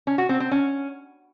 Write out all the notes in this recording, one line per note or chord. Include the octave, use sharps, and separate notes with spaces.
C#4
F#4
C4
C4
C#4